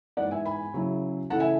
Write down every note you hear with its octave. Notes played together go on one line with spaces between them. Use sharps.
G#2 E3 B3 D5 F#5
E5 G#5
G#5 B5
C#3 F#3 C#4 E4
C#3 E3 A3 E4 F#5 A5
E5 G#5